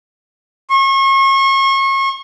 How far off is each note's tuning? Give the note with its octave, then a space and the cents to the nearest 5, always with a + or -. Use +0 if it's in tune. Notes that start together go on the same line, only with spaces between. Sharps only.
C#6 -35